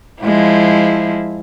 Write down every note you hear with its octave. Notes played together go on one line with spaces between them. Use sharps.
F3 G#3 E4